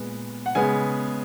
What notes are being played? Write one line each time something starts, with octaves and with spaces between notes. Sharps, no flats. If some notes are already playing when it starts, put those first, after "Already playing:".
Already playing: A#2 G#3 B3
F#5
C#3 G#3 B3 G#5